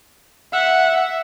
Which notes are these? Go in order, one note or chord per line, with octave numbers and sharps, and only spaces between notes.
E5 F#5